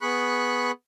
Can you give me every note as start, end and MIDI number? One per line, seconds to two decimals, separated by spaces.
0.01 0.71 59
0.01 0.71 68
0.01 0.71 83
0.01 0.71 85
0.01 0.71 90